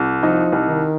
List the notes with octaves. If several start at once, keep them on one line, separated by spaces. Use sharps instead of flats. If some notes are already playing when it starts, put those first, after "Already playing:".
Already playing: C2
F3 D#4
C2
D#3